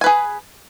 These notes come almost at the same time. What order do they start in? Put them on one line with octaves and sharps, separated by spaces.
G#5 B4 G#4